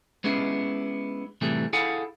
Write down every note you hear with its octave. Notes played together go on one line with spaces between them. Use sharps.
G#3 B3 C#4 D4 E4 G#4
A2 C3 E3 G3 A3 G#4
E4 G#4 A4 F5 F#5 G#5